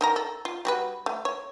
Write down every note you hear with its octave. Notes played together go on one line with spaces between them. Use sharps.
D#3 A#4 A#5
A4
F4
G3 F#4 B4
A3
C#5